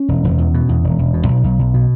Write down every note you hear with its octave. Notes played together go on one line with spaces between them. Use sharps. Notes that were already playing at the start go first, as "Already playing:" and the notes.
Already playing: C#4
E1
E1
E2
B2
E2
E1
E1
B2
B1
B1
B1
B2